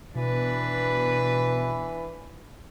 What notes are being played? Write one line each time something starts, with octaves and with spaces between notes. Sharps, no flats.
B2 E3 D4 B4